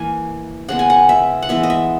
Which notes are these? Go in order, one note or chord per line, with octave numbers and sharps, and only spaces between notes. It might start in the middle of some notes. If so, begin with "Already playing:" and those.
Already playing: E3 A#3 G#5
C#3 G#3 B3 F#5
G#5
F#5
E5
F#5
E3 G#3 B3 E5
D#5
E5